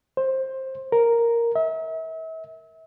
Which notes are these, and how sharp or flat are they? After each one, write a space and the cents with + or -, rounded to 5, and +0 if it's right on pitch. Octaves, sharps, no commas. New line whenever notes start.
C5 +15
A#4 +0
E5 -40